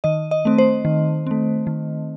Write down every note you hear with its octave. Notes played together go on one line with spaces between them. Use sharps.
D#3 D#5
D#5
A3 C4
C5
D#3
A3 C4
D#3